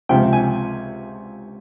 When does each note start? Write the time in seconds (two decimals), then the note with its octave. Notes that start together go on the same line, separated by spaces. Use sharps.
0.09 C#2 C3 F3 G5
0.33 G#5